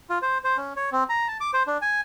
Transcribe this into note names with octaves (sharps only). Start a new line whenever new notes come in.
F4
C5
C5
C#4
C#5
C4
A#5
A5
D6
C5
D4
G#5